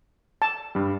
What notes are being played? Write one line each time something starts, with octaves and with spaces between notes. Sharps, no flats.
A5
G2 G3